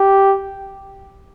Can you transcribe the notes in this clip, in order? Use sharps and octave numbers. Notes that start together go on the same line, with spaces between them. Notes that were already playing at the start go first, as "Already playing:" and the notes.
Already playing: G4